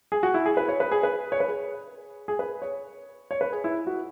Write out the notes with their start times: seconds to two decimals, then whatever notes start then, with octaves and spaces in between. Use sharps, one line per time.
0.12 G#4
0.23 F#4
0.34 E4
0.46 G#4
0.57 B4
0.68 C#5
0.80 B4
0.91 G#4
1.03 B4
1.32 C#5
1.40 B4
1.48 G#4
2.28 G#4
2.39 B4
2.62 C#5
3.31 C#5
3.41 B4
3.53 G#4
3.64 E4
3.87 F#4